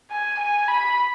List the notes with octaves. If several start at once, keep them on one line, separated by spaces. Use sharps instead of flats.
G#5
G#5
B5